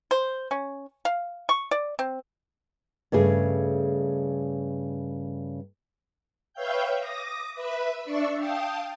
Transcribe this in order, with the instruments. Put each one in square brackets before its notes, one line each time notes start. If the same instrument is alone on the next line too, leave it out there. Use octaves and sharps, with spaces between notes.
[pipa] C5
C#4
F5
C#6
D5
C4
[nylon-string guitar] G2 C#3 A3 G#4
[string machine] B4 C#5 E5 F5 G5 G6
D6 D#6 A#6
B4 E5 B5
D4 D5 E5 C#6 E6
F5 G5 A5 D#6